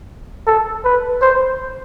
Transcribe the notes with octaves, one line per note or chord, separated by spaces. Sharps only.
A4
B4
C5